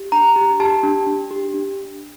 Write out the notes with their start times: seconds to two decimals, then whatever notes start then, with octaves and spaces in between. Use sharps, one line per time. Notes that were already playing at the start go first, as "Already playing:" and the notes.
Already playing: G4
0.12 D4 A#5
0.36 G4
0.60 G4 A5
0.83 D4
1.07 D4
1.31 G4
1.54 D4